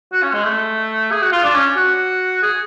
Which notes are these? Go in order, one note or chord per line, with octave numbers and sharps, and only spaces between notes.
F#4
C#4
G#3
A3
G#4
F#4
F4
D4
C#4
F#4
G#4